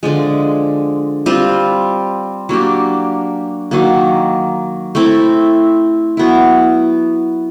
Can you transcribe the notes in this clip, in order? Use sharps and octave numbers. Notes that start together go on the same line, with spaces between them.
D3 F3 G#3
G3 C4 F4
F#3 A#3 D4 G4
D#3 F#3 A#3
A3 C4 E4
F#3 B3 E4